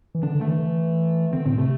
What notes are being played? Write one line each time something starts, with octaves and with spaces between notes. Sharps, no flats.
E3
D3 D4
D3
A3
E3
E3
D3 C4
A2 C4
C3 A3